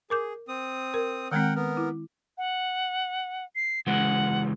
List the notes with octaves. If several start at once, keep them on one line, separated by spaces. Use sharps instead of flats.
G#4 A#4 D6 G6
C4 D#6
A#4
D#3 G#3 C4 A#4 F#5 G5
B3 A#4
E4
F#5
C7
C#3 E3 G#3 F#5